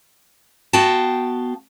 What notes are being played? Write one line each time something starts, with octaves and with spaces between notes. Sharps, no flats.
B3 F#4 F5 G5 A5